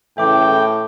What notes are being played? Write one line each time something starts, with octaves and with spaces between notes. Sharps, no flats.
A2 C#3 E3 A4 E5 G5 D6